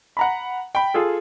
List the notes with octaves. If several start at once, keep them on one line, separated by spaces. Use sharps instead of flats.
F#5 A#5 B5
G5 B5
F4 G#4 A4